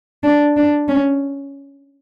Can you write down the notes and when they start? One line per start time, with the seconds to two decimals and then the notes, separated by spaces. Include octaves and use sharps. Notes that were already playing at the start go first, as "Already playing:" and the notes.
0.23 D4
0.57 D4
0.88 C#4